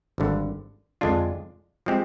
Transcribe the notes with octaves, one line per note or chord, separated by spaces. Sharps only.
G#1 G2 D3
F2 D3 G#3 D4 F4
F3 G#3 C4 G4